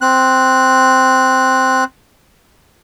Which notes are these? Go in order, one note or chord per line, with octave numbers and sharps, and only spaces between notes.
C4 F#6